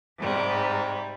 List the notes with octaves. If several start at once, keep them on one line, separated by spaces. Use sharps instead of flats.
G#2 C3 G3